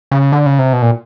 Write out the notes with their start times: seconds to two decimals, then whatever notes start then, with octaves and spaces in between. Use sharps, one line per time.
0.11 C#3
0.32 D3
0.46 C#3
0.59 C3
0.73 B2
0.82 A#2